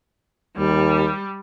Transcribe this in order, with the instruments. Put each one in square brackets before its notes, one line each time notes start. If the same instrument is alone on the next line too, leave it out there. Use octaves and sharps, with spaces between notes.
[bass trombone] D#2 [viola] G3